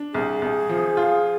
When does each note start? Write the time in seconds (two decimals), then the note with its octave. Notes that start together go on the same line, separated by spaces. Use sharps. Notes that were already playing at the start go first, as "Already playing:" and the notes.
Already playing: D4
0.13 C2 G#4
0.42 C2
0.69 F3
0.97 F4